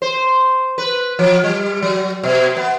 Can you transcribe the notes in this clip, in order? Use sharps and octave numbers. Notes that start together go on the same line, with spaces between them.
C5
B4
F3
G3
F#3
B2
B3